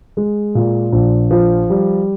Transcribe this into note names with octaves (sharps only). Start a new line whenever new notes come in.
G#3
A#2
A#1
F3
G3